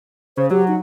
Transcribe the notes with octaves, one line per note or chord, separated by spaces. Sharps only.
C#3 C5
F#3 G4
D#4